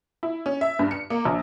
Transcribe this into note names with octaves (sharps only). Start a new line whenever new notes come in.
E4
C#4
E5
G2
C#7
A#3
A#1